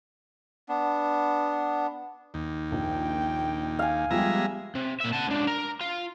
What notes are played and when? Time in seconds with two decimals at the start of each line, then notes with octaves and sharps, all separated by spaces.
0.69 B3 D4
2.34 D#2
2.72 A#1 G5
3.79 F5 G#5
4.11 F3 G3 G#3 B3 G4 E5 A#5
4.75 C3
5.00 A#2 E5
5.12 F#5 A5
5.27 C#2 D4
5.47 A#4
5.81 F4